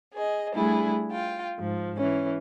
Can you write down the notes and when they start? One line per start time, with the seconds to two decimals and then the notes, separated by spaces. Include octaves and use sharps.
0.13 G#4 D#5
0.54 G3 A3 D4 E4 G#4
1.11 F4 G5
1.58 G#2 F3
1.96 E3 C#4